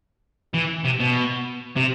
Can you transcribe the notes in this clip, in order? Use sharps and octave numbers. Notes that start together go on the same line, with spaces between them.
E3
C3
B2
C3